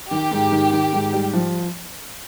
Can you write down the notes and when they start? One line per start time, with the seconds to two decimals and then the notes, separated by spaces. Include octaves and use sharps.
0.10 D#3 G4
0.31 G#2
0.51 D#3
0.73 D#3
0.93 G#2
1.13 G3
1.33 F3